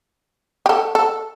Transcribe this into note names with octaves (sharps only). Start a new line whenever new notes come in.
G4
A4
A4